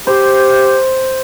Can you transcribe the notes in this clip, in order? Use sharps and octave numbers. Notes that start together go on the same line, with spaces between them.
G4 C5